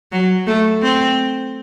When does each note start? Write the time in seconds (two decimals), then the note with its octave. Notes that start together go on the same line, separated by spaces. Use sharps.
0.12 F#3
0.47 A3
0.82 C4